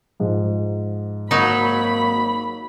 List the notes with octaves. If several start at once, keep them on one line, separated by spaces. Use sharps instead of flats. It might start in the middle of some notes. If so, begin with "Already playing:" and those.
G#2 F3
G#1 F#3 A#3 D#4 B5